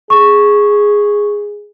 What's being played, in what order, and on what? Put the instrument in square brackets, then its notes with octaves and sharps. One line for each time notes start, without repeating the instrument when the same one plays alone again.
[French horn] G#4 [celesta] C#6